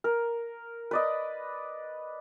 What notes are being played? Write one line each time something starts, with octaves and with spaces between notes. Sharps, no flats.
A#4
B4 D5 D#5